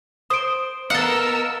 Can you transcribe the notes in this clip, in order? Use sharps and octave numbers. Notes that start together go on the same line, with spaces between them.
C5 D#6 D7
B3 A4 A#4 D#5 F5 F#5 E6